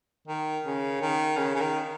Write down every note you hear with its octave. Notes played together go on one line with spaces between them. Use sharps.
D#3
C#3
D#3
C#3
C#3
D#3